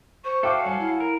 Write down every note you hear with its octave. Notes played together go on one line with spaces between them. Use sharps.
C5 C#6
F#4 A4 E5 F5 G5 D6
G3 C#5 G#5
E4
A#4